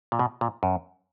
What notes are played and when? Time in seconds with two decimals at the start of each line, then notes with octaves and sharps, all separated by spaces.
0.12 A#2
0.19 B2
0.41 A#2
0.63 F#2